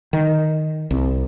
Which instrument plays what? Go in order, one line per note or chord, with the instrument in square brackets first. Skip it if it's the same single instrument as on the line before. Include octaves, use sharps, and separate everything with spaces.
[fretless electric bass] D#3
C2